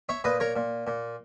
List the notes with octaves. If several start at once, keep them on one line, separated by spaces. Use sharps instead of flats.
C#5 E5
A#2 B4 D#5
A#4 C#5
A#2
A#2